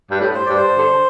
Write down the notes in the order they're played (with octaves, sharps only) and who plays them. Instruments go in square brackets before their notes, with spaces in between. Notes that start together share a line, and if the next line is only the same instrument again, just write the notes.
[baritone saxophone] G2
A2
[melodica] C5
[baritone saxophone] G2 [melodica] D5
[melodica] C5
[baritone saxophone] D3